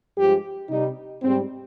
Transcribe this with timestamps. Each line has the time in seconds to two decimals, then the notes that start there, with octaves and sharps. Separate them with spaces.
0.18 G2 F3 G#3 G4
0.70 C3 G3 D#4
1.22 G#2 G3 C4